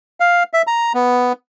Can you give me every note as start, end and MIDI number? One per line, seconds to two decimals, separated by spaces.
0.20 0.43 77
0.53 0.62 76
0.67 0.93 82
0.94 1.32 59